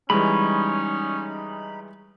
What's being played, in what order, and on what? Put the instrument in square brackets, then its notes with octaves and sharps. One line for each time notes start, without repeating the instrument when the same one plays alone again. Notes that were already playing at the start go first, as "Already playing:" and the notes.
[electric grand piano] E3 G3 G#3 [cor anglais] C#4 [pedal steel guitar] D#4 B5